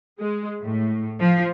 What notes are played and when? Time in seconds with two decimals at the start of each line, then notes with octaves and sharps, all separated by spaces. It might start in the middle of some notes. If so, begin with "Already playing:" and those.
0.20 G#3
0.61 A2
1.20 F3